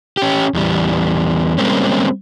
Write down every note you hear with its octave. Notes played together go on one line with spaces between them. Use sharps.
C#4 G4
E2 G3
G3 G#3 A#3 C4 C#4